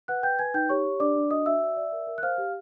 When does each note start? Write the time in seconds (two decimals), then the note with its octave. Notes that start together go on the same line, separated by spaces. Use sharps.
0.08 B4 F#5 F#6
0.23 B4 G5 G6
0.39 B4 G#5 G#6
0.54 D#4 G5 G6
0.69 G4 C#5 C#6
0.86 G4
1.00 D4 D5 D6
1.16 D4
1.31 F#4 D#5 D#6
1.46 F#4 E5 E6
1.62 D5
1.77 D5
1.92 A#4
2.07 A#4
2.18 F#6
2.23 C5 F5 F6
2.38 G4